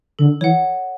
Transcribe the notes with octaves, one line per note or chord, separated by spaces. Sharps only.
D3 A4
E3 C#5 F#5